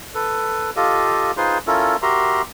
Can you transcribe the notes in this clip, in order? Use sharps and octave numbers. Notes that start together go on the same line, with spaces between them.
A4 B4
F4 G4 A4 D#5 F5
D#4 F4 G#4 B4 C5 C6
C#4 E4 F4 A4 A#4
F#4 G4 A#4 E5 A#5 C6